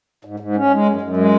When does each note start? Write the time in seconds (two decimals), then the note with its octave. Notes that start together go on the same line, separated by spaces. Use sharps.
0.25 G#2
0.40 G#2
0.56 C#4
0.71 G#3
0.86 F#2
1.01 F#2
1.17 G#3